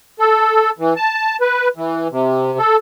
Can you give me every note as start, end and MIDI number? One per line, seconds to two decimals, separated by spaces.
0.19 0.71 69
0.79 0.94 52
0.96 1.36 81
1.41 1.68 71
1.76 2.08 52
2.11 2.58 48
2.59 2.76 69